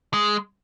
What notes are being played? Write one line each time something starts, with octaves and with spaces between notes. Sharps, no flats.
G#3